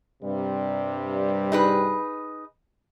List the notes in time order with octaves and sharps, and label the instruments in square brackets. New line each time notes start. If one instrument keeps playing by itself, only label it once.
[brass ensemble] G2 C3 G3
[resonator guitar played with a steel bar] D#4 G#4 B4